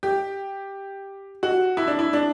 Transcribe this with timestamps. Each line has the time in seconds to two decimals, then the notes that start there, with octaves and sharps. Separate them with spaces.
0.03 G4
1.43 F#4
1.77 E4
1.87 D4
1.99 E4
2.13 D4